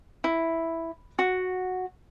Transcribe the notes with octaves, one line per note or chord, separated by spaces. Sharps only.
E4
F#4